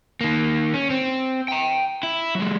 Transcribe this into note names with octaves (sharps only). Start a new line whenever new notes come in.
D#3 A#3
C#4
C4
G5 A#5
E4
F#3 G#3